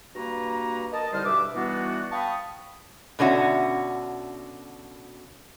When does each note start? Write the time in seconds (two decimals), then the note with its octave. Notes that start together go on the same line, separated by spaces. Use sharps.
0.15 G2 A#3 F#4 B4 A#5
0.92 A#4 D#5 A5
1.12 C2 D3 G3 D#4 C5 F6
1.24 G2 B2 B4 E5 D6
1.54 E3 G3 B3 D4 D#4 F#4
2.11 F5 G5 A5 B5 C#6 D#6
3.19 B2 D3 C#4 F#4 E5